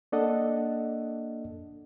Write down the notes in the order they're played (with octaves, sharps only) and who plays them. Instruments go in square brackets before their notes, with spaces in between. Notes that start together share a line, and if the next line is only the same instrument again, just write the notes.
[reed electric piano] A#3 D4 A4 D5 D#5 F#5